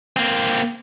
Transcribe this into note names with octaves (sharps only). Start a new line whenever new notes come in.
A#3 C4